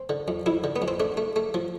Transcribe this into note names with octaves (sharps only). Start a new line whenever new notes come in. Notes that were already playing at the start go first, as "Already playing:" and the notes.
Already playing: C4
D3
F2
F2 E4
D3
B3
F2
C4
A3 D4
A3
A3
F3